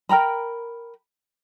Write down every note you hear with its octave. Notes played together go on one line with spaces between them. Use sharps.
A#4 G5 A#5 B5